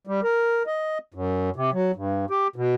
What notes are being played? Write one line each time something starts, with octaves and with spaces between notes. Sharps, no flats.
G3
A#4
D#5
F#2
C3
F#3
G2
G4
B2